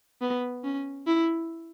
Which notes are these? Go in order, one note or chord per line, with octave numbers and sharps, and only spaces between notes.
B3
C#4
E4